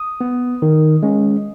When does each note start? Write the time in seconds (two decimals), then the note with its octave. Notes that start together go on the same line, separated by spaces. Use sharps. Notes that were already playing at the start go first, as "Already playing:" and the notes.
Already playing: D#6
0.21 B3
0.62 D#3
1.03 G#3 C#4